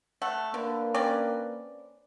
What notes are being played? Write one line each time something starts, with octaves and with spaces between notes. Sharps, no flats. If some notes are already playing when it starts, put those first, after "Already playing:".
A3 F#5
D3 A#3 D4 B4
C4 C#4 D5